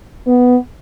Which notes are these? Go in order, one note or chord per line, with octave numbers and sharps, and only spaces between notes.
B3